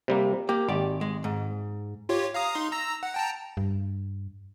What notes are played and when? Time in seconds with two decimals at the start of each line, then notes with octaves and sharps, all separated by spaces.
0.08 C3 G3 A#3
0.49 A#3 G4
0.69 G#1 G4 D5
1.01 G#3
1.24 G#2
2.09 F4 G4 C#5
2.34 F5 A#5 D#6
2.55 D#4 C6
2.71 A#5 E6 A#6
3.03 F#5
3.14 G5 A5 A#5
3.57 G2